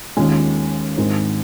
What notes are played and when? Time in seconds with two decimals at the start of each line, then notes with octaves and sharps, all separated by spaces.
0.17 D#2 D#3 G#3 C#4 F4
0.97 G#2 D#3 G#3 C4 D#4